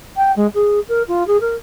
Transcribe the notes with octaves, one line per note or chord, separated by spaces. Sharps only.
G5
G#3
G#4
A#4
F4
G#4
A#4